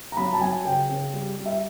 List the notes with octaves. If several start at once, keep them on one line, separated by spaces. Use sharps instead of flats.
A#5
F#3 B5
A5
F#3 G#5
C#3 G5
C#3
G3
G3
E5